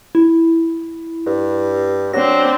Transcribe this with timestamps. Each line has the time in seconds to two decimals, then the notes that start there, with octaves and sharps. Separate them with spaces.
0.15 E4
1.26 G2
2.14 F#3 C4 D4 A#6